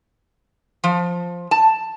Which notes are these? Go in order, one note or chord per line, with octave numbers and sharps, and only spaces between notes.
F3
A5